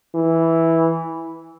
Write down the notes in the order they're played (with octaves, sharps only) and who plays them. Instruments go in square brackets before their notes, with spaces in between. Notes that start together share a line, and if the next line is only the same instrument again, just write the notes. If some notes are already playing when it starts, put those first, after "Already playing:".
[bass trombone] E3